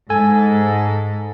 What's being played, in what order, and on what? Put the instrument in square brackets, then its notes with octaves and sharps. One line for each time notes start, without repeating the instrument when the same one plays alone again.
[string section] G#2 [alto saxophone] A4 [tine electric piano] G#5